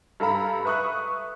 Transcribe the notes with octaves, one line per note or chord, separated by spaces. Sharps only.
G2 A4 F5 A#5 B5
B4 E5 C#6 D#6 F#6